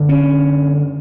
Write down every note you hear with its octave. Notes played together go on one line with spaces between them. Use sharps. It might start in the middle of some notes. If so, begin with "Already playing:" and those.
Already playing: F#2 D3
C#4